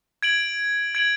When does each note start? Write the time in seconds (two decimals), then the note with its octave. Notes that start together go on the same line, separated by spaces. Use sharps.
0.22 G#6 D7 F#7
0.95 G#6 D7 F#7